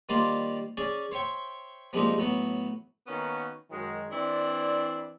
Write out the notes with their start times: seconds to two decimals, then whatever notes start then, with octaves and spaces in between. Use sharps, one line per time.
0.09 D#3 G3 A#3 F4 C5 D5
0.77 C#4 G#4 D5
1.12 C5 C#5 E5 G5 C#6
1.93 F3 G3 G#3 A#3 C4 D#4
2.18 A2 F#3 B3
3.07 D#3 A#3 B3 C#4 F#4
3.70 F#2 D#3 F#3 G#3
4.11 E3 C4 D4 E4 D5